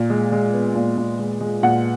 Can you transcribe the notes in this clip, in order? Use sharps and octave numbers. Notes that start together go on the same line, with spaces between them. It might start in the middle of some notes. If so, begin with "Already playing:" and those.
Already playing: A#2
G#3
G#3
B3
A#2
A#2
G#3
G#3
A#2 F#5